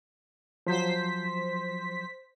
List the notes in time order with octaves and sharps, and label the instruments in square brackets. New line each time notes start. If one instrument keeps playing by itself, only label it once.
[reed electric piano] F3 F#3 [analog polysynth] C5 B6